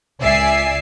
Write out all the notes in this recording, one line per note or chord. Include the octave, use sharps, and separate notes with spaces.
C#2 D5 E5 G#5 C7